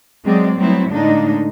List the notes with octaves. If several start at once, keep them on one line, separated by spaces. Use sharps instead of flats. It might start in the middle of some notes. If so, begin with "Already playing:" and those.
F#3 G#3 C4 G#4 D5
F#3 G3 A3 B3 C4 E4
A2 D3 G#3 A#3 D4 D#4